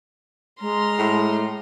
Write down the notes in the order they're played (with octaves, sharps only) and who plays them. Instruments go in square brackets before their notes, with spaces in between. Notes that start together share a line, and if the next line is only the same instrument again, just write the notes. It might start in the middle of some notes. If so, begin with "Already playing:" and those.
[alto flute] G#3 [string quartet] A#5 C6 F6
[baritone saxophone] A2